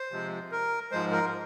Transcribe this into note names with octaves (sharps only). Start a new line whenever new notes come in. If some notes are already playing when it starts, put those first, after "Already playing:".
Already playing: C5
C3 F3 G#3
A#4
G#2 F3 G#3 C5
A#4